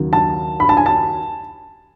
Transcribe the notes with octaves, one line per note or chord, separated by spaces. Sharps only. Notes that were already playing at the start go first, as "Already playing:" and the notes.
Already playing: D#2 C#3 F#3
A5
B5
A5
G#5
A5